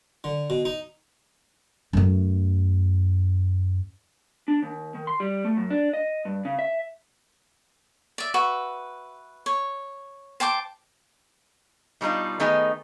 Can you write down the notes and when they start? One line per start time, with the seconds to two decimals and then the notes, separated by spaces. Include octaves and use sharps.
0.24 D3
0.50 B2
0.65 D#4
1.93 F#2 A3
4.48 D4
4.63 D#2
4.95 D#3
5.07 C6
5.20 G3
5.44 A3
5.57 F#2
5.70 D4
5.93 D#5
6.25 G2
6.45 C#3
6.59 E5
8.18 D5 E5
8.34 F#4 B4 E5
9.46 C#5
10.40 C5 G5 A5 D6
12.01 B2 G3 D4 D#4 F4
12.40 D#3 A3 B3 D#4 G#4